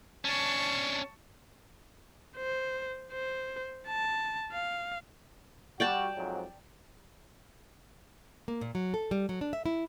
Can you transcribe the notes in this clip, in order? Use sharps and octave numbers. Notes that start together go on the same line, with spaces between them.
C#4 D4 A5 C#6
C5
C5
A5
F5
G3 F#4 D5 G5 A5
F2 G#2 F#3
A#3
A#2
F#3
A4
G3
F#3
D4
E5
E4